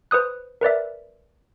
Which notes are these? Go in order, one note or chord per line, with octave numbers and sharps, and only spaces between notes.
B4 C5 D#6 F#6
A#4 B4 D5 E5